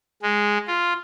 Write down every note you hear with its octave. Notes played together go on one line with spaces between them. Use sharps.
G#3
F4